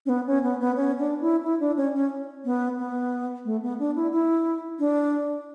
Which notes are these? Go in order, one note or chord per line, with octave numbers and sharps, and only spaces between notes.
C#4
B3
C#4
B3
B3
C#4
D4
E4
E4
D4
C#4
C#4
B3
B3
A3
B3
D4
E4
E4
D4